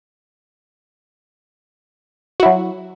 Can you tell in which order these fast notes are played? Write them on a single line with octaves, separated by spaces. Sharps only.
F#4 E4 F#3